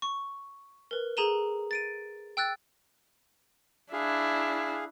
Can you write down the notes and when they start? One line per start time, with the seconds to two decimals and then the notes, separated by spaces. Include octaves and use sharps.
0.02 C#6
0.91 A#4 B4
1.17 G#4 A4 A#5 D#7 E7 G7
1.71 A6 D7 D#7
2.37 G5 E6 F#6 A6
3.93 D4 E4 G#4 F5